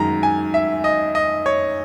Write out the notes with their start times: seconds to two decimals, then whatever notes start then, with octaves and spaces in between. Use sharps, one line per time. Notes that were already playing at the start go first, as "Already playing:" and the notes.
Already playing: F#2 D#3 G#3 A#5
0.23 G#5
0.54 E5
0.84 D#5
1.15 D#5
1.46 C#5